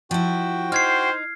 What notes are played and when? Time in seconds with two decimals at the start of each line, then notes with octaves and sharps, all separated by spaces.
0.11 F3 E4 F#4 G5
0.72 D#4 C5 F6 G#6 C7